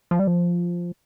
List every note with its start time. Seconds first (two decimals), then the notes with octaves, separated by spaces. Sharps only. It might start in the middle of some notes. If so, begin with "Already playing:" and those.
0.11 F3
0.19 G3
0.27 F3